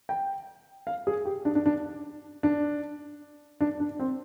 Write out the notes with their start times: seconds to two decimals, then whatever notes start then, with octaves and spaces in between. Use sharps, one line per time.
0.09 G5
0.87 F5
1.07 G#4
1.26 G4
1.45 D4
1.55 D4
1.66 D4
2.43 D4
3.61 D4
3.80 D4
3.99 C4